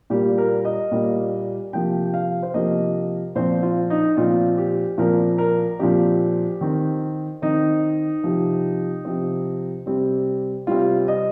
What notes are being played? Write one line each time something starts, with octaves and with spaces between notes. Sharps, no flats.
A#2 G3 A#3 G4
A#4
D#5
A#2 G3 A#3
C3 F3 A#3 G5
F5
C5
C3 F3 A#3 D#5
A#2 F3 C4 C5
F4
D#4
A#2 F3 C4 F4
G4
A#2 F3 C4 A#4
A#4
A#2 F3 C4 G4
D#3 C4
D#3 C4 D#4
C3 F3 C4
C3 F3 C4
C3 G3 C4
C3 G3 C4 F4
D#5